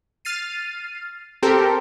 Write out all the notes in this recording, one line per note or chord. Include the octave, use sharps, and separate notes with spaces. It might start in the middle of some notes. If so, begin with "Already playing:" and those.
F6 A6 C7 D#7
C4 G4 A4 A#4 C5